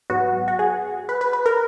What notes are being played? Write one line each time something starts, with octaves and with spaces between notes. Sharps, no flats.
G#2 F#3 B3 F#4
F#4
G#4
B4
B4
B4
A#4